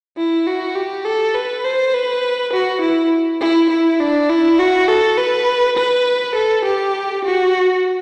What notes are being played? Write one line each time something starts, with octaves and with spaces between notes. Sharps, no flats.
E4
F#4
G4
A4
B4
C5
B4
F#4
E4
E4
E4
D4
E4
F#4
A4
B4
B4
A4
G4
F#4